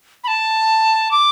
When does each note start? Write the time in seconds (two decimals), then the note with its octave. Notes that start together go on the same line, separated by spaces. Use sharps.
0.24 B5
0.28 A5
1.11 D6